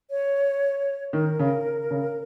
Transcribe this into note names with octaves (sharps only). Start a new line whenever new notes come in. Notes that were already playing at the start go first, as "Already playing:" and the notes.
C#5
D#3 A#4
C#3
C#3